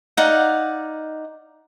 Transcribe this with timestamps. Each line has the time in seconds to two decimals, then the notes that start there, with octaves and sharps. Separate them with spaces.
0.17 D#4 D5 F5 F#5